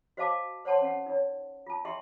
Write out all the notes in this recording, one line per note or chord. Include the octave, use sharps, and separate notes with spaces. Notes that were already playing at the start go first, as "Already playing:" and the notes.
F#4 C5 D#5 F5 A5 D6
C5 C#5 F#5 A5 C6
C#4 F#5
D#4 C#5
F4 A5
E4 G4 D#5 E5 G5 C6